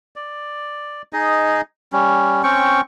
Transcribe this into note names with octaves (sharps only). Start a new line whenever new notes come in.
D5
D#4 G#4 D#5
G3 C#4
C4 C#4 G5 C#6